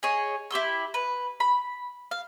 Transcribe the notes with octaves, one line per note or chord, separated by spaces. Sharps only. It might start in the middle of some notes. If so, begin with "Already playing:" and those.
G#4 C#5 D#5
E4 G4 C6 E6
B4
B5
F5